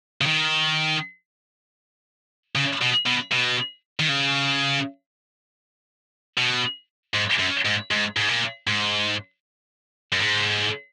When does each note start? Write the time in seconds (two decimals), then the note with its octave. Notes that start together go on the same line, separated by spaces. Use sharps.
0.21 C#3
0.26 D#3
2.55 C#3
2.81 B2
3.06 B2
3.32 B2
4.00 D#3
4.09 C#3
6.38 B2
7.15 G#2
7.40 F#2
7.66 G#2
7.91 G#2
8.17 G#2
8.29 A#2
8.67 G#2
10.12 F#2
10.20 G#2